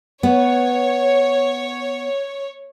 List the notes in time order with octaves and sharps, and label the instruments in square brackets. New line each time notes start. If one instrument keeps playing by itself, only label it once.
[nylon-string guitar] B3 [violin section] C#5